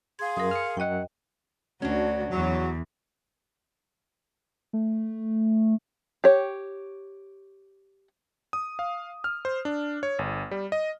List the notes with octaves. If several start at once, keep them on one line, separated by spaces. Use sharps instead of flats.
G#4 F5 C6 G#6
F#2 A#4 D#6
F6 C#7
F#2 F#4 D#5 F#5 G5
D2 C#4 D4 F#4
E2 F#3
A3
G4 C#5
D#6
F5
F6
C5
D4
C#5
G1
G3
D#5